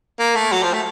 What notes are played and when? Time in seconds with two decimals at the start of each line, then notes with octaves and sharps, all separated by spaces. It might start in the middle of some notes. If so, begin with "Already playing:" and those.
0.19 A#3
0.36 A3
0.52 F#3
0.63 F3
0.73 A3